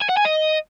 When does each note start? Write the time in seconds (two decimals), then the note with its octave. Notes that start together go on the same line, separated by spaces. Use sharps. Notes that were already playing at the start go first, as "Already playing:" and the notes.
0.02 G#5
0.09 F#5
0.17 G#5
0.25 D#5